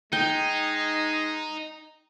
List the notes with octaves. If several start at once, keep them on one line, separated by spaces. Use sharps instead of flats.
G#3 D#4 G5